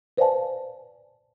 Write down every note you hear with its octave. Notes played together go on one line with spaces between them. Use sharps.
B4 C5 D5 F5 G#5 A5